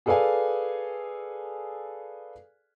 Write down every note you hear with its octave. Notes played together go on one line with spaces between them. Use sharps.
G#4 A4 B4 D5 F5 G#5